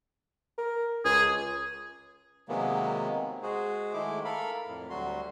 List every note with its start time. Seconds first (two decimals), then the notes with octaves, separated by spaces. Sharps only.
0.58 A#4
1.05 C#2 G#4
2.49 C3 D#3 F#3 G#3 A#3 B3
3.43 G#3 F#4 G#4 C5
3.93 D#3 G#3 A3 E4 D6
4.25 A4 A#4 F5 B5
4.67 F2 A2
4.90 D2 F#3 G3 F#4 C6